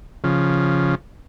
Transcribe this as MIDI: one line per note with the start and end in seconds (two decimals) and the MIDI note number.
0.24 0.95 49
0.24 0.95 53